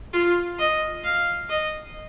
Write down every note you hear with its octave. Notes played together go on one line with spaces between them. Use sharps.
F4
D#5
F5
D#5